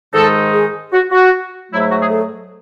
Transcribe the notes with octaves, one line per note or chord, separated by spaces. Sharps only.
G#2 D#3 G#3 D#4 A4
G#4
F#4
F#4
G#2 F#3 A3 E4
E4
F#4
G#4
A4